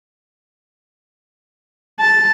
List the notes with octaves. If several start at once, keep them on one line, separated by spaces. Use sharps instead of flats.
A5